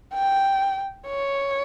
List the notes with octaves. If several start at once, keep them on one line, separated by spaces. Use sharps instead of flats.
G5
C#5